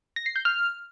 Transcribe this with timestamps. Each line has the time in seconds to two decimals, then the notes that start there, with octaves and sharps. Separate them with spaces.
0.16 A#6
0.26 C7
0.36 G6
0.45 F6